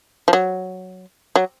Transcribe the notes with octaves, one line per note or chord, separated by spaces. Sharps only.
F3
F#3
F#3